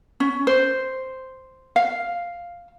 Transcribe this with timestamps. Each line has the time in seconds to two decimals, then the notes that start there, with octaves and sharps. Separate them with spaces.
0.20 C#4
0.47 C5
1.76 F5